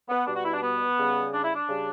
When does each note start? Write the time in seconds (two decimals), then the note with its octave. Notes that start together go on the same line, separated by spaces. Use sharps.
0.09 B3
0.27 B2 G3 D4
0.36 F#4
0.45 E4
0.54 D4
0.62 B3
0.97 C#3 G3
1.33 D4
1.43 E4
1.55 D4
1.68 C#3 G3